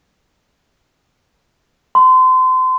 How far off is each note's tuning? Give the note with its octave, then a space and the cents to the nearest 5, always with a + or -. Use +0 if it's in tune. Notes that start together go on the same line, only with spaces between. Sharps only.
C6 -30